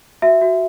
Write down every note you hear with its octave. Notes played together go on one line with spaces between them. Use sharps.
F#4 E5
F#4